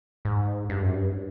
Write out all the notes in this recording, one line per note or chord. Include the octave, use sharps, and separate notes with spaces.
G#2
G2
F#2
G2